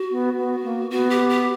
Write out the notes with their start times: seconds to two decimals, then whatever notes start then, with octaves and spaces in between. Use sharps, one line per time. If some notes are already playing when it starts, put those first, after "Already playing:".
Already playing: F#4
0.11 B3
0.37 B3
0.64 A#3
0.90 B3 F#4
1.10 G4
1.30 G4